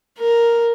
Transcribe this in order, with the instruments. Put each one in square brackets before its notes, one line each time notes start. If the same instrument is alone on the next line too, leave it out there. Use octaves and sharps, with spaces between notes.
[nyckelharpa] A#4